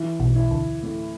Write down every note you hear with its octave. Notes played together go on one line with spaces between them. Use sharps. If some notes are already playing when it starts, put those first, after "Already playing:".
Already playing: E3
B1 B2
E4
D2 D3
A2